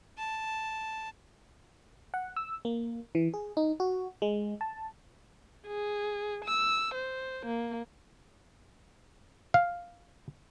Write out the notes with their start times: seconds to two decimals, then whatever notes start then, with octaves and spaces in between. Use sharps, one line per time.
0.18 A5
2.14 F#5
2.36 E6
2.65 A#3
3.15 E3
3.34 G#4
3.57 D#4
3.80 F#4
4.22 G#3
4.61 A5
5.67 G#4
6.45 E6
6.95 C5
7.46 A#3
9.54 F5